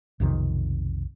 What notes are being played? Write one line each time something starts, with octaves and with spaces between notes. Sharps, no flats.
B1 F2 C3 D#3